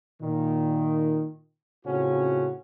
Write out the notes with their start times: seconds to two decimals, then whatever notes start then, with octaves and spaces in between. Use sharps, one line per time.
0.22 A#2 D#3
1.85 A2 C#3 C4 C#4 F4 F#4